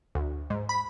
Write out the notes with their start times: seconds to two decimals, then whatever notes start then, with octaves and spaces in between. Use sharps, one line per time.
0.15 D2
0.50 G#2
0.69 B5